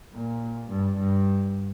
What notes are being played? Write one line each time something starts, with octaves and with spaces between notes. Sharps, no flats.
A#2
G2
G2